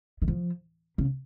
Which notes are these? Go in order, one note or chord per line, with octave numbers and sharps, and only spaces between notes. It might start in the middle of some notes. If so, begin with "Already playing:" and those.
D#3
F3
C#3